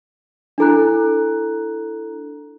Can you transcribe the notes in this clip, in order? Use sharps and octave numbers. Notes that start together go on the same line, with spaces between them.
D4 E4 A4 A#5 F#6